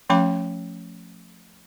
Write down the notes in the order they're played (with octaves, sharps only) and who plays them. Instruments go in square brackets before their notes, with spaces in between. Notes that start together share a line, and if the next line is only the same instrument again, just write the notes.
[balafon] F3 A3 C#4 F5 B5 D6